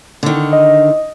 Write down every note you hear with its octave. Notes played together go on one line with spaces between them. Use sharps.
D3 D#3
D#5